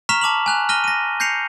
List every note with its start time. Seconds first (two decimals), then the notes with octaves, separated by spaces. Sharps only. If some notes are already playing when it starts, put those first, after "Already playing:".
0.09 A#5 C#6 F6 B6 E7 F7
0.21 A5 D6 F7 F#7
0.46 G#5 F#6 F7
0.69 F6 A#6 D#7 G7
0.84 A#6 D#7
1.20 G6 A#6 C7 C#7 F7